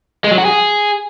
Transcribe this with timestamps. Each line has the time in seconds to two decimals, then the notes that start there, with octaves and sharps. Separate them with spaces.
0.24 G#3
0.31 F#3
0.38 F#4
0.45 G#4